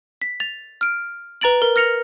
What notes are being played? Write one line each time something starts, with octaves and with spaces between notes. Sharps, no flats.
B6
A6 F7
F6 D7
B4 A#5 A6 D7 F#7
A#4
F6 A#6 C#7 F7